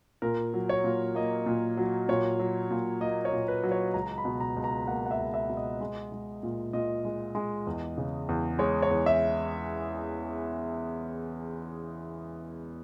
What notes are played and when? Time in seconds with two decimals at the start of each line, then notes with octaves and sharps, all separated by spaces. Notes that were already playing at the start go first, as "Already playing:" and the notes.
0.22 A#2 A#4
0.54 F#3
0.69 C#5
0.84 A#2
1.15 A#3 D#5
1.46 A#2
1.77 F#3
2.08 A#2 C#5
2.40 F#3
2.70 A#2
3.01 A#3 D#5
3.25 C#5
3.33 A#2
3.48 B4
3.63 F#3
3.72 C#5
3.94 C#2 A#5
4.18 B5
4.25 B2
4.41 A#5
4.56 C#2
4.64 A#5
4.87 A#3 F#5
5.06 F#5
5.11 E5
5.19 C#2
5.34 E5
5.49 B2
5.57 D#5
5.81 G#3
6.12 G#3
6.43 A#2
6.73 A#2 D#5
7.05 G#3
7.35 G#3
7.67 E2
7.98 C#3
8.29 E2
8.59 G#3 C#5
8.82 C#5
8.91 E2
9.06 E5